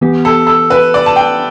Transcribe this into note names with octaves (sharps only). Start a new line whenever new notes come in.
E3 B3 G4
A4
A4
B4
D5
A5
G5